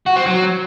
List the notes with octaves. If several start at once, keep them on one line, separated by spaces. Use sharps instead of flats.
F#4
C4
F#3